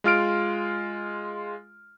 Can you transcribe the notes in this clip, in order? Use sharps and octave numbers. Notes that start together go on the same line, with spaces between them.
G#3 F4 F6 D7